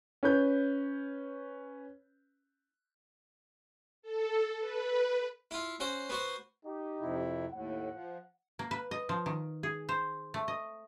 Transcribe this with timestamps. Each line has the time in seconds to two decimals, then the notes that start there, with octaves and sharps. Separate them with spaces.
0.23 C#4 B4 G6
4.02 A4
4.59 B4
5.51 E4 F4
5.80 C#4 F#4 C5
6.09 B3 F#4 C5
6.65 D#4 G4
7.00 F2 C3 E4
7.51 D#2 A2 F#5
7.91 F3
8.59 A#3
8.71 B4
8.91 D#5
9.09 F3
9.26 D#3
9.63 G#4
9.89 C5
10.34 A3
10.48 D#5